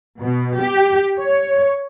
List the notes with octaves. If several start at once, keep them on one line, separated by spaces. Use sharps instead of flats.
B2
G4
C#5